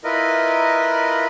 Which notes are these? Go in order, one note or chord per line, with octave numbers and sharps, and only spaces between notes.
E4 F4 A#4 B4 D#5